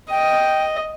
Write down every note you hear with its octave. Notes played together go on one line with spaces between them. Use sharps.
D#5 G5